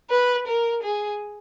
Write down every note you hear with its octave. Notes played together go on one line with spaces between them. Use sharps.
B4
A#4
G#4